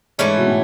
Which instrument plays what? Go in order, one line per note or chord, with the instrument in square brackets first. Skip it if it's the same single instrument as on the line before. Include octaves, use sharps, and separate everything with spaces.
[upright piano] G#2 [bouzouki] E3 A3 C#4
[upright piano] B2
A2